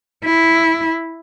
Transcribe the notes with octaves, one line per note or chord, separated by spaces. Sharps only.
E4